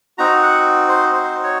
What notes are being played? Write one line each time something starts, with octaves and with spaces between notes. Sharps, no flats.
C4 D#4 F#4 A#5
F#5
C5
C5
C#5